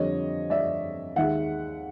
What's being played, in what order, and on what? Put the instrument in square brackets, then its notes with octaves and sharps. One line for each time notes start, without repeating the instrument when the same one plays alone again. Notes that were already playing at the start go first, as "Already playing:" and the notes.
Already playing: [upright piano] F2 D3 G3 C#5 D#5
D5 E5
D#2 D#3 G#3 E5 F#5